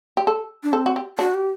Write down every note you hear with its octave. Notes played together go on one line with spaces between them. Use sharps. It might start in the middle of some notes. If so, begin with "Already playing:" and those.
G4
A4
D4
C4 A4
F#4
G4
D4 F#4
G4